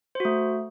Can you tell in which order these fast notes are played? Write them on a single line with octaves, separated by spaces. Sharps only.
C5 F#4 A3